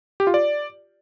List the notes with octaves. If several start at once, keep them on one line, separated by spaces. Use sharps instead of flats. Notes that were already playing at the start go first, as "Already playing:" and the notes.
G4
F4
D5